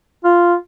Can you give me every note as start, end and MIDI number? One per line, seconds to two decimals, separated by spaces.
0.24 0.54 65